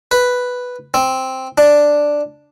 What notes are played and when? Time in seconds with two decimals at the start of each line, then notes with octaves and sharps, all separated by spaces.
0.11 B4
0.94 C4
1.58 D4